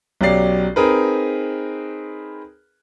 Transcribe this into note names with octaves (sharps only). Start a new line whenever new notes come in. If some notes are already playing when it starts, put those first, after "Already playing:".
B1 F#3 C#4 G4 D5 C7
C4 D#4 G#4 A#4 B4